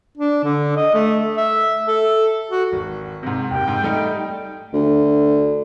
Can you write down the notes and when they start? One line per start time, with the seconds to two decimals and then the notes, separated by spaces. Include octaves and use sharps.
0.18 D4
0.44 D3
0.76 D#5
0.94 A3
1.37 E5
1.88 A4
2.51 F#4
2.72 G#1
3.23 G#2 C3
3.50 F#1 G4 G5
3.68 G#2
3.83 G3 A3 D#4
4.73 D2